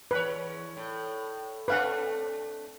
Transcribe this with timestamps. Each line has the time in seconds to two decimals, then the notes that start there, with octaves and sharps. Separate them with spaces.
0.11 E2 B4 C#5
0.77 A2
1.68 A3 C4 D4 B4 F5 F#5